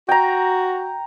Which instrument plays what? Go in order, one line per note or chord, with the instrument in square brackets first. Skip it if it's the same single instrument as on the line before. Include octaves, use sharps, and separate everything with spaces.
[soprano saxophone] F#4 [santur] G5 A#5